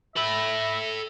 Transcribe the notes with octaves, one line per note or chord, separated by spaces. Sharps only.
A4 E5 B5